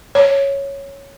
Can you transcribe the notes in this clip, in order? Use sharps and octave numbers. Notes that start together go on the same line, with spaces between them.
C#5